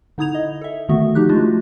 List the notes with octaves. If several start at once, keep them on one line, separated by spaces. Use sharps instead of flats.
D3 D#4 E4 D#6 G#6 F7
D#5
A4 E5
D3 D#3 A3 B3 F#4 E5
F3 D#4 G4 F#6
G#3 A3 D4 F4 F#4